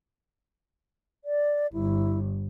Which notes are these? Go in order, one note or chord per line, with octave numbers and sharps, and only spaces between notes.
D5
G1 E4